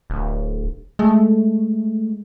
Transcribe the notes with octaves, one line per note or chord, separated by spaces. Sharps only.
D1
G#3 A3